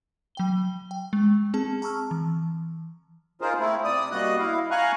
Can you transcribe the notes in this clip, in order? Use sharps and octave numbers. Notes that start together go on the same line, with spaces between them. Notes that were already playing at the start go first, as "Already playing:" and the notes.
F#3 G5 G7
G5
G#3
C4 G#4 A5
A5 A#5 C#6 E6 F6
E3
D#4 F4 G#4 A#4 C5
A3 C4 E4
C3 D5 D#6
G3 A#3 F#4 D#5 D#6 F#6
E4 F5
F5 F#5 G#5 A#5 C#6 F#6